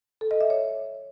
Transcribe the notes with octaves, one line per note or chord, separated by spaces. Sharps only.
A4
D#5
E5
C#5